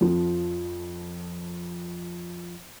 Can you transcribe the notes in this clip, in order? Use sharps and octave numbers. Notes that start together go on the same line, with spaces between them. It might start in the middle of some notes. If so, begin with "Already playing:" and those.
F2 F3